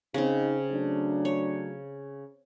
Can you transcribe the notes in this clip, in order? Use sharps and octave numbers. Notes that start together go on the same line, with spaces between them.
C#3 C4 D#4
F#3 A3 D4
C#5